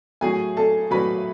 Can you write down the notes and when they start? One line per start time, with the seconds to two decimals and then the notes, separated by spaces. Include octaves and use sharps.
0.21 A2 F#3 G#4 G#5
0.57 A4 A5
0.91 A2 F#3 B4 B5